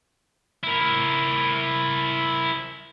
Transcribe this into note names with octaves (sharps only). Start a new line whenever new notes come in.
E4 A#4